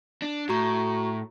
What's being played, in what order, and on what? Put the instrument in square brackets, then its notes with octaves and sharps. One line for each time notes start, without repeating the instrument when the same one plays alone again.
[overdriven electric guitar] D4
[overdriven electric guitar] A2 [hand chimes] F#4 A#5 C#6